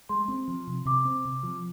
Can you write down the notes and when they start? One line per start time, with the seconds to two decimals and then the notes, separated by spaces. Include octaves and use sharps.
0.09 G#3 C6
0.28 C4
0.48 F3
0.67 C3
0.86 C3 D6
1.05 C4
1.25 C3
1.43 F3